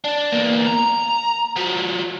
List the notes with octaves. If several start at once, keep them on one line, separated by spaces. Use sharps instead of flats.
D4
E2 A#3
A#5
F3 F#3